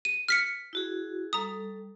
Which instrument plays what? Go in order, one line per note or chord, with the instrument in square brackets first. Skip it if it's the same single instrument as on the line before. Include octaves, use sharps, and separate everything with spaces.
[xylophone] D#7
F6 B6 C#7
[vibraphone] E4 F#4 G#4
[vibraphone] G3 A4 [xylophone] A#5 D#6